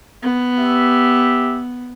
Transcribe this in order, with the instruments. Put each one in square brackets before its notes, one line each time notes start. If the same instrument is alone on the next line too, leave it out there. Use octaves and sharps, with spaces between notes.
[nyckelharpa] B3
[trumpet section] G4 E5